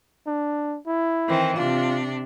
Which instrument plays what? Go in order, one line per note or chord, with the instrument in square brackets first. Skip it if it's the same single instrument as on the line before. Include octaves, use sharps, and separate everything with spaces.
[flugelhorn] D4
E4
[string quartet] D#3 E3 C4
[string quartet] C3 D4 [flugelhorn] F4